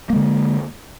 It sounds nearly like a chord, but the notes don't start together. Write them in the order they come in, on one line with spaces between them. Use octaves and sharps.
A#3 G#3 D3